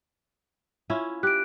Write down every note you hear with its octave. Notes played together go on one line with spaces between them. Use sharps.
C#4 E4 F4
G4 F#6 D7